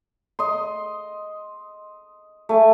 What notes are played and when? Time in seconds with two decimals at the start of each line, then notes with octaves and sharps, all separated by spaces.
0.39 D#5 C6
2.49 A3 G#5